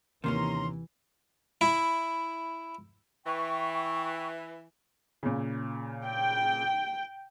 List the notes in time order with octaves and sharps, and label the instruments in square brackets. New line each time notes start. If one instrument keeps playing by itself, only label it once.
[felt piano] D#2 C3 [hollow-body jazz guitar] D#3 A#3 C#4 [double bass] E3 [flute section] A#5 C6
[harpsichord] E4
[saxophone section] E3 [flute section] G5 C#6
[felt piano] A#2 C#3
[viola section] G5